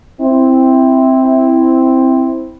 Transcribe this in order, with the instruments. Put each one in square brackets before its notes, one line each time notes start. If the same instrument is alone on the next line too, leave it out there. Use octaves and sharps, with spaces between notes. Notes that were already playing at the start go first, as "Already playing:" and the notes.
[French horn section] C4 E4